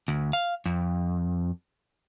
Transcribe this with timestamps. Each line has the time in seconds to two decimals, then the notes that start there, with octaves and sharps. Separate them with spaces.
0.08 D2
0.33 F5
0.66 F2